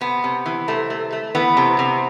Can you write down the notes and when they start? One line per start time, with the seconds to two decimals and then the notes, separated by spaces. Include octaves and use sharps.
0.01 C3 B3
0.24 C3
0.46 E3
0.68 C3 A3
0.90 A3
1.12 A3
1.35 E3 B3
1.57 C3
1.79 C3